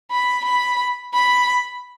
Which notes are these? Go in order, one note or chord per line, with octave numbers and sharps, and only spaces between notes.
B5
B5
B5